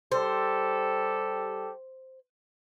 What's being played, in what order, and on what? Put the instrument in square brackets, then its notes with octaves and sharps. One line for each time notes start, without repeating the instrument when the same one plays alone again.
[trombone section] G3 G4 A4 [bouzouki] C5